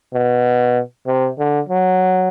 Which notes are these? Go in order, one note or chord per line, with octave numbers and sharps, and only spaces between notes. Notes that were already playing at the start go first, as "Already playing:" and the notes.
B2
C3
D3
F#3